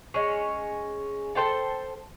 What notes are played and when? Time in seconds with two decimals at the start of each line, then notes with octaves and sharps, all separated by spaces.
0.14 G#3 C#4
1.35 A4 C5 G5 A5